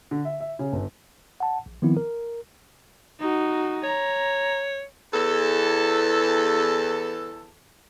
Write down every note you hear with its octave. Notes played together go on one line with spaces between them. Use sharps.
D3
E5
E5
C#3
G1
F#5 A5
A#1
D#3 F3 B3 C4 E4
A#4
D#4 F#4
C#5 A#5
E2 A4